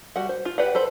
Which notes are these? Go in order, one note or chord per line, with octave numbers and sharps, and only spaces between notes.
G3 F#4 F#5
C5
F4
G4 B4 D5 F#5
A4 B4 C5